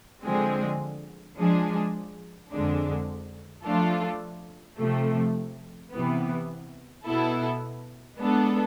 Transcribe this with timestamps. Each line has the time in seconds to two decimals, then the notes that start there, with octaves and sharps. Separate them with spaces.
0.24 D3 F3 G#3 C4 G#4
1.37 F3 G#3 D4 G#4
2.51 F2 D3 G#3 D4
3.64 F3 A3 D4 F4 A4
4.78 C3 F3 A3
5.91 C3 E3 B3
7.05 B2 B3 E4 A4
8.18 G#3 B3 D4 A4